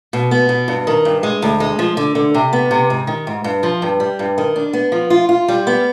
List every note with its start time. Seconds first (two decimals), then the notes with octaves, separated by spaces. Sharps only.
0.13 B2
0.31 B3
0.49 B2
0.68 G2
0.87 D#3
1.05 G2
1.23 G#3
1.42 D2
1.60 G#3
1.79 F3
1.97 D3
2.15 D3
2.34 C3
2.53 B3
2.71 C3
2.90 G#2
3.07 D#3
3.27 G#2
3.44 G2
3.63 F3
3.82 G2
4.00 G3
4.19 G2
4.38 D#3
4.56 D4
4.73 B3
4.92 F3
5.10 F4
5.29 F4
5.48 G3
5.67 B3